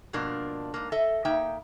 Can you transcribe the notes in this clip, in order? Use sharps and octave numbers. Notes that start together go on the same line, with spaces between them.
G2 B2 F3 A#3 D4
G#2 A#3
A4 D#5 E5
A#3 D#4 E5 G5